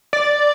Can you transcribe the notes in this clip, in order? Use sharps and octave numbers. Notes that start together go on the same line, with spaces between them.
D5